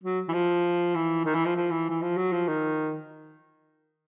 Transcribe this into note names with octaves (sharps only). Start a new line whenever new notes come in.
F#3
E3
F3
E3
D#3
E3
F3
F3
E3
E3
F3
F#3
F3
D#3